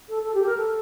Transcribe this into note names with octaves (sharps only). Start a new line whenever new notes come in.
A4
A4
G4
A#4
A4